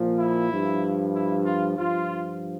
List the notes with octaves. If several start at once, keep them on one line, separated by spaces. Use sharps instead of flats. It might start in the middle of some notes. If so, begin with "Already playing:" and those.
Already playing: A#2 F3
E4
G2 F3
E4
F4
G2 F3 F4